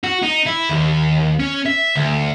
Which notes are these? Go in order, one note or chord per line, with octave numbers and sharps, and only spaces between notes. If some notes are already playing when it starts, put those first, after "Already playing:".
F#4
D#4
E4
D#2
C#4
E5
D2